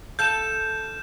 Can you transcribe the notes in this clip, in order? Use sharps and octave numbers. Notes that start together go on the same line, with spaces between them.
A4 F5 G6 E7